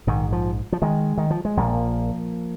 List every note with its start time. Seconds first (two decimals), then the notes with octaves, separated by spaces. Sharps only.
0.07 A#1 G#2 D#3
0.32 F3
0.72 F3
0.82 D#3 G#3
1.18 D#3
1.30 F3
1.45 G#3
1.57 A#1 A#2 F3 A#3